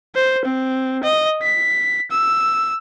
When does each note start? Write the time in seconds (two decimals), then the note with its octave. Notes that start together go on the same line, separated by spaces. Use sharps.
0.15 C5
0.45 C4
1.03 D#5
1.42 B6
2.11 E6